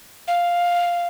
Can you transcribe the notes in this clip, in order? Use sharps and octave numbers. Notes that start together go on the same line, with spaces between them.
F5